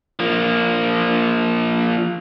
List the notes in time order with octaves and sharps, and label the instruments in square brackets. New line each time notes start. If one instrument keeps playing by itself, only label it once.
[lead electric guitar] F3 A#3